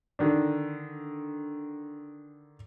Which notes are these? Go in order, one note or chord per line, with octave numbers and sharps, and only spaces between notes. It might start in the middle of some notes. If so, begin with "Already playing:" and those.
D3 D#3 D4